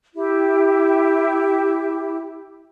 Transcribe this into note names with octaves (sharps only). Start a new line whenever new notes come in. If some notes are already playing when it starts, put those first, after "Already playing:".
E4 G4